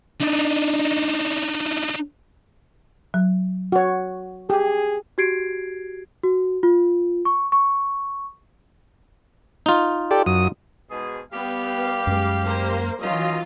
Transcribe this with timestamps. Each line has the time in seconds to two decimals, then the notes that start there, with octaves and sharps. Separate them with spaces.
0.21 D4 D#4
3.14 F#3
3.72 F#4 C#5
4.50 G4 G#4
5.18 F#4 G4 G#6 C7 D7
6.23 F#4
6.63 F4
7.25 C#6
7.52 C#6
9.66 D#4 F4
10.11 G4 A4 D5
10.26 F#2 D#6
10.90 G#2 B2 G#4
11.33 G3 B3 G4 F5
12.07 F#2 G#3
12.45 A#3 C5
13.01 D#3 E3 F#3 C#4 F4 D#5